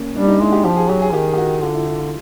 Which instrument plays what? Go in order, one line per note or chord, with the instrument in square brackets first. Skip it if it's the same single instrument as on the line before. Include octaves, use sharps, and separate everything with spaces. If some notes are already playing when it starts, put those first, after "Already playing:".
Already playing: [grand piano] A#3 C#4
[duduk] G3 [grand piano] D4
[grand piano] D#4
[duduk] G#3 [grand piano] E4
[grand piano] G4
[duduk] F3 [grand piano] G4
[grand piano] G#4
[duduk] F#3 [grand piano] G4
[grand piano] G#4
[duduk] D#3 [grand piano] G4
[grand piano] G4
F#4
[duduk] D3 [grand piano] F4
[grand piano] E4
E4
F4